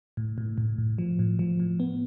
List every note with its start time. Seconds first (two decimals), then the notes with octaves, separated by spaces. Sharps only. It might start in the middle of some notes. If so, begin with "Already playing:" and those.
0.17 A2
0.38 A2
0.58 A2
0.78 A2
0.98 F3
1.19 A2
1.39 F3
1.60 A2
1.80 B3